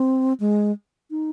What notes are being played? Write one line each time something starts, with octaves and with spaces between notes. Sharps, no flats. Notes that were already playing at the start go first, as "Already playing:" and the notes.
Already playing: C4
G#3
D#4